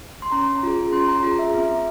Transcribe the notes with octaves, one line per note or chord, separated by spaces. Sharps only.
C6
C#4 A#5
F4 G#4
C#4 C6
A#5
F4 G#4 A#5
E5
C4